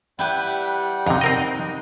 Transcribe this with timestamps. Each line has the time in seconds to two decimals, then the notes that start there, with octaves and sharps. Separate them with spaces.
0.19 G3 E4 G4 B4 F#5 G5
1.06 F2 C3 D#4
1.21 C4 A#4 D#5